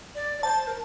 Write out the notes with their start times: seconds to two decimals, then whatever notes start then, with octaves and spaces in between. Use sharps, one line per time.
0.15 D5
0.38 D5
0.43 C5 A5
0.67 A#4